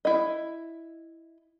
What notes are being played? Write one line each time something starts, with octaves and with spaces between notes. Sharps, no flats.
E4 D#5